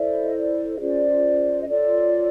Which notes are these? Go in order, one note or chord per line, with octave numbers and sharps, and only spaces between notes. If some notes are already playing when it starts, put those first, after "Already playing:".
Already playing: E4 A4 C5 D5 E5
D#5
D5
D#5
C#4 F4 G#4 C5 D5
D#5
F4 A4 C#5 D5